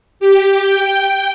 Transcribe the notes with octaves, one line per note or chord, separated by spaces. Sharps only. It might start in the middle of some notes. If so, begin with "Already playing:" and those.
G4
G5